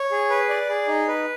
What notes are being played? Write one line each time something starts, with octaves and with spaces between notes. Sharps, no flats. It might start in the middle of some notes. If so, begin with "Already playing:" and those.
Already playing: C#5
G#4
B4
D5
G#4
D#4
B4